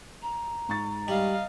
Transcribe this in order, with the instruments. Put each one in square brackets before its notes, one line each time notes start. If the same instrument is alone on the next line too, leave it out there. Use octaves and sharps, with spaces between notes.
[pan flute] A#5
[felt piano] G#2 C#6 A6
[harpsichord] G3 [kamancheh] D#5 F5